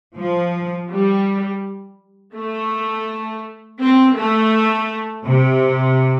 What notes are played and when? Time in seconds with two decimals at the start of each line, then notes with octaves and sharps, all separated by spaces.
0.17 F3
0.89 G3
2.35 A3
3.81 C4
4.16 A3
5.26 C3